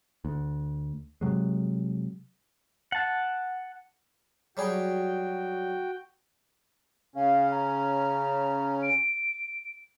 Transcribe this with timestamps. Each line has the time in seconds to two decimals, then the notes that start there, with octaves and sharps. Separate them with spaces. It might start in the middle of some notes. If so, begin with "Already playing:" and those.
0.25 D2
1.21 C3 F#3 G#3
2.92 F#5 A5
4.57 F#3 G3 F#4 G#4 G5
7.16 C#3 C#4 F5
7.51 A#5
8.82 D7